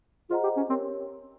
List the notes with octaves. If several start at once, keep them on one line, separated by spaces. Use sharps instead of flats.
F4 G#4 C5 D#5 F#5 A#5
G4
C#4
C4 G4 A#4 C#5